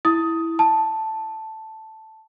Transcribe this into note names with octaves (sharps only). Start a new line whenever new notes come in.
E4 D#6
A5